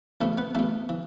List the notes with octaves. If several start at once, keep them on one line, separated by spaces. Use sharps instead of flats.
E2 B2 A3 A4
B3 B4
E2 B2 A3 A4
E3